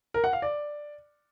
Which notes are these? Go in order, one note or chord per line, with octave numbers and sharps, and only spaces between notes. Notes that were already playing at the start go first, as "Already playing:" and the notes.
A#4
F#5
F5
D5